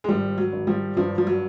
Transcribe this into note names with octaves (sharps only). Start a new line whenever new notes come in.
G#3
G#1 F3 G3
F#3
G#1
F3 G3
G2 F3
F3
F#3